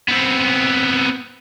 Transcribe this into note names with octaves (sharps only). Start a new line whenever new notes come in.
B3 C4